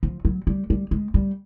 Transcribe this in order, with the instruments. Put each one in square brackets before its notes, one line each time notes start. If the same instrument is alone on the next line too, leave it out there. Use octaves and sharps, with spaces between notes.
[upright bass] F3
F#3
G3
G3
G#3
G3